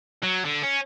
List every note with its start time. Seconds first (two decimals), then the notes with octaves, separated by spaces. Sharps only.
0.23 F#3
0.45 D3
0.63 C#4